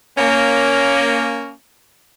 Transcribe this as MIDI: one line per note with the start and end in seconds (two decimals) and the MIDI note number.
0.17 1.51 58
0.17 1.51 61